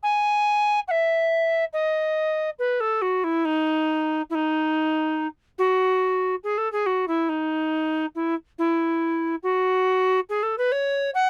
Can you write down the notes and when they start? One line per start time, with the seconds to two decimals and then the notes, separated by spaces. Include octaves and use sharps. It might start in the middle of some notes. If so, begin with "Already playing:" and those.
0.03 G#5
0.87 F#5
0.91 E5
1.73 D#5
2.59 B4
2.80 A4
3.01 F#4
3.24 E4
3.45 D#4
4.30 E4
4.34 D#4
5.58 F#4
6.43 G#4
6.57 A4
6.72 G#4
6.86 F#4
7.07 E4
7.29 D#4
8.15 E4
8.58 E4
9.43 F#4
10.29 G#4
10.43 A4
10.58 B4
10.72 C#5
11.14 F#5